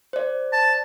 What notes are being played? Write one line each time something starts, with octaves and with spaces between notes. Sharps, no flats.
C5 D5
A5